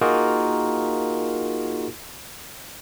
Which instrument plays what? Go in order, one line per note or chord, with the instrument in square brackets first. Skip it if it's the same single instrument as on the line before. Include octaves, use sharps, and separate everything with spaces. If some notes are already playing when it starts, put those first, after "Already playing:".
[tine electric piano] A#3 D#4 F4 F#4 G#4 A#4